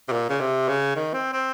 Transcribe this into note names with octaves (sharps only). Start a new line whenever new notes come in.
C3
A#2
C#3
C3
C#3
D#3
C4
C4